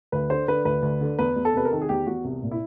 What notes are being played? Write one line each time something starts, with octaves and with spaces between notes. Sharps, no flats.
D2 B4
D3 C5
D3 B4
D2 B4
D2
D3
E2 B4
E2
A4
C3 B4
A#4
D#3 A4
G#4
E2 G4
E2 F#4
C2
A#2
E4